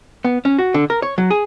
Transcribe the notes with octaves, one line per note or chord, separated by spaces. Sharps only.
B3
C#4
F#4
D3
A#4
C#5
F#3
G#4